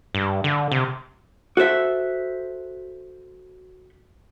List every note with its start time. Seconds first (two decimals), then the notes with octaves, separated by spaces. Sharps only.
0.15 G2
0.44 D3
0.72 C3
1.57 F#4 A4 C5 E5